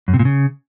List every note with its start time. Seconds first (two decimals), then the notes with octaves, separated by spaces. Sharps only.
0.08 F#2
0.14 C3
0.19 A#2
0.25 C#3